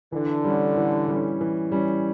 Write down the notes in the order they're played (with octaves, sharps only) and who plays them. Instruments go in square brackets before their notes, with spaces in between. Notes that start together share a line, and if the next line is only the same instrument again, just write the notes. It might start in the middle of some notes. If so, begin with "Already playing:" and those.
[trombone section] D3 [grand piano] E3
[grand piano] G3 C#4
E3
G3 C#4
E3
G3 C#4